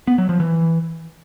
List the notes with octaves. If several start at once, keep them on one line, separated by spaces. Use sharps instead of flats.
B3
F#3
F3
E3